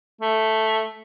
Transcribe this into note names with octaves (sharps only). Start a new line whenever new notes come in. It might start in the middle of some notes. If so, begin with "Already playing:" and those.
A3